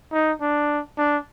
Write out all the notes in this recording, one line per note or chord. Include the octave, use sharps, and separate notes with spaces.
D#4
D4
D4